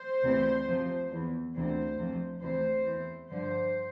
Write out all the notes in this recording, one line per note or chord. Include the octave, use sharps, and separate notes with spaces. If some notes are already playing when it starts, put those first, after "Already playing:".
Already playing: C5
D2 C3 E3
F2 C3 F3
E2 E3
D2 C3 E3 C5
F2 C3 F3
D2 C3 E3 C5
E2 E3
G2 D3 F3 C5